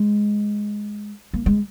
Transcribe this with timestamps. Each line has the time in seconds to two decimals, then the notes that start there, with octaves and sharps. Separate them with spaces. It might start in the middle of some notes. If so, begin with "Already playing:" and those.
Already playing: G#3
1.34 A#3
1.46 G#3